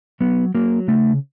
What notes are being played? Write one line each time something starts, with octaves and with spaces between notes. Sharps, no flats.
F#3 B3
F#3 A#3
C#3 A3